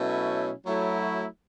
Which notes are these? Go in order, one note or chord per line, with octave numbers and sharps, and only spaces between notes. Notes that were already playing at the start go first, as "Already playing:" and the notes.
Already playing: B2 F#3 A3 C#4 E4
F#3 A3 E4